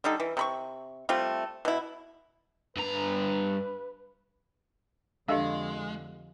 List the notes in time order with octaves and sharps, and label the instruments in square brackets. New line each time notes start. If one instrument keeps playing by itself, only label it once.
[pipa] D3 G3 D#4 A4
E3
C3 B5 C#6
G3 A3 C4 F4
B2 E4
[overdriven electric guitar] G2 A#5 [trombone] B4
[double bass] F2 D3 [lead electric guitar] G#3 [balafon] D4 A4 [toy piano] G4 D#5 F5